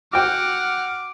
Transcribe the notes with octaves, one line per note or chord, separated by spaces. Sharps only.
F#4 F#5 G5 D6 F6